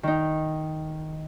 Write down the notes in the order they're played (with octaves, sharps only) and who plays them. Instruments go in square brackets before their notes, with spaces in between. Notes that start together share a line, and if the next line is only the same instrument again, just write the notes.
[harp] D#3 D#4